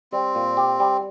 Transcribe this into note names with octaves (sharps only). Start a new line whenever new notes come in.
G3 C4
A#2
G4
G3